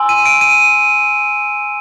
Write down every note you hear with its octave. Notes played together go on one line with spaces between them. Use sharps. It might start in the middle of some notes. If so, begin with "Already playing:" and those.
Already playing: G#5 C6 E6
D#7
D7
D#7